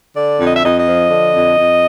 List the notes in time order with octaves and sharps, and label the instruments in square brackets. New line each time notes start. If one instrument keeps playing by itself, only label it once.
[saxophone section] D3 D5
F2
D#5
E5
F2 D#5
D#5
F3
D3
F2
F2